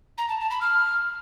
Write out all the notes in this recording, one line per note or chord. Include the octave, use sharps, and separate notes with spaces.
A#5
A5
A5
B5
F6